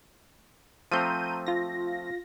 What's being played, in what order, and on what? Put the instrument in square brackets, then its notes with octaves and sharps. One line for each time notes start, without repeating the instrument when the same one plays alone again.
[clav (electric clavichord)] F3 A3 C4 [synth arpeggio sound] A#5 G6 D#7
[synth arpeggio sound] F4 A#6